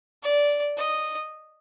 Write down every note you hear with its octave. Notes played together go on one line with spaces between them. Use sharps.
D5
D#5